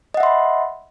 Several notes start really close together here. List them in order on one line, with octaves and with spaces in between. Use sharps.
D#5 F#5 E5 C6 B5